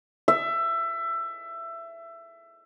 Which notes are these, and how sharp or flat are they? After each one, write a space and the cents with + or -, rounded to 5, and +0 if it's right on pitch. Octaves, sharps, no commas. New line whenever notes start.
E5 +20